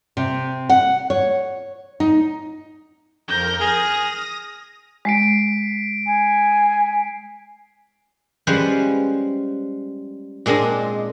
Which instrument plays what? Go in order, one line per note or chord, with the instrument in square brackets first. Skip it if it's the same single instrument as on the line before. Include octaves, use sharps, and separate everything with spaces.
[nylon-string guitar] C3
F#5
C#5
D#4
[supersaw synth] F2 A#4 [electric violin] G6 A#6
[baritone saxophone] G#4 [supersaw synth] D#6 A#6 [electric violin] F6
[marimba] G#3 [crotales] B6 C7 D7
[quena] G#5
[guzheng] F3 G3 G#3 C#4 B4 C5
A#2 G#3 C4 D4 D#5